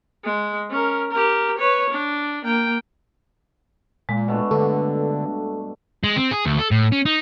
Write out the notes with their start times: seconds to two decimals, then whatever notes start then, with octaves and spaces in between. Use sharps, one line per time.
0.24 G#3
0.70 C#4 A#4
1.11 G4 A#4
1.58 B4 C#5
1.90 D4
2.45 A#3 G5
4.09 A#2 G#3
4.28 B2 A3 D4
4.51 G2 D3 A4 C#6
6.04 G#3
6.16 C4
6.32 G#4
6.46 D2
6.59 A4
6.71 A2
6.92 C#4
7.06 D#4